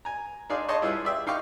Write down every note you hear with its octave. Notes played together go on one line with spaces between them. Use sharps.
G#5 A#5
D4 D#4 G#4 D5 F5 C6
C#5 D#5 A5 C6 C#6
G3 E4 F4 G#4 B4 E6
D5 E5 G5
D#4 F5 G5 C#6 D6